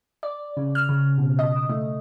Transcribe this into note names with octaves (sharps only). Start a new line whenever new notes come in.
D5
C#3
F6
C#3
B2
D#5
A3